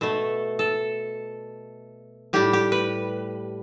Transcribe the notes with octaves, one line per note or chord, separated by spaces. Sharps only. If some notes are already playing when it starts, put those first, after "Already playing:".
B2 A3 A4
A4
A2 G3 G4
G4
B4